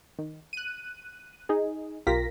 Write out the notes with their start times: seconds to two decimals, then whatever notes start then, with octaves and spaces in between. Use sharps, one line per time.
0.19 D#3
0.53 F#6 D#7
1.49 D#4 G#4
2.07 B1 F4 G4 A#4 A#6 B6